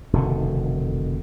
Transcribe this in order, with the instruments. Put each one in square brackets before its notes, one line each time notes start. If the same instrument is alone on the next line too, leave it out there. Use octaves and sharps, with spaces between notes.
[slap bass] F1 B2 D3 D#3